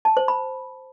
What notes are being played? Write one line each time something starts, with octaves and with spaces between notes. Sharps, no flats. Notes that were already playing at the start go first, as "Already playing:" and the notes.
A5
C5
B5